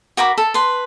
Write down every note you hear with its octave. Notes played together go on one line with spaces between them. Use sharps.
F#4 A#4 B5 D6
A4
B4 C6